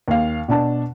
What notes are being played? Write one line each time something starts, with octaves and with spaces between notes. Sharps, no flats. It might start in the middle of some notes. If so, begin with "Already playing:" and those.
D#2 F5
B2 D4 A5